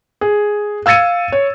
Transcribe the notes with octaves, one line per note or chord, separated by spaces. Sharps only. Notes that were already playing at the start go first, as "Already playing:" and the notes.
G#4
F5 E6 G#6 A6 C#7 D#7
C#5